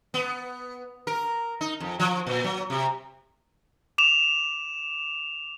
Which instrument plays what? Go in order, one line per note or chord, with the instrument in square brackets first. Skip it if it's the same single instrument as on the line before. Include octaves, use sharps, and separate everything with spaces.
[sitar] B3
A#4
D#4
F2
F3
A#2
F#3
C3
[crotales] D6 E7 F7